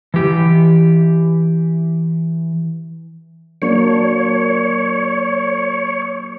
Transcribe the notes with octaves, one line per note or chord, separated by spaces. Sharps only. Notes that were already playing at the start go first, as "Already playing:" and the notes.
E3 G4
F#3 A#3 D4 C#5